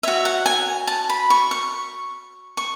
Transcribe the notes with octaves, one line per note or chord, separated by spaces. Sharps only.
F#4 C#5 E5
F#5
G#5
A5
B5
C#6
C#6
C#6